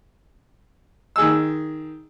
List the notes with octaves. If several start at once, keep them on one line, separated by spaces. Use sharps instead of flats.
D#3 G#4 E6